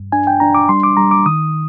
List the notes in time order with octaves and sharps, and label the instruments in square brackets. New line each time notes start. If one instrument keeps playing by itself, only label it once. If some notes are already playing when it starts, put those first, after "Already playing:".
Already playing: [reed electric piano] G2
D4 G#5
G5
D4 A#5
D6
G3 C6
D6
G3 A#5
D6
D#3 D#6